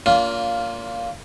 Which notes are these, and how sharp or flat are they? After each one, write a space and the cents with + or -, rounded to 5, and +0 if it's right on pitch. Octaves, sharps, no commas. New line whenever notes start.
A#3 -5 D4 -45 F4 +0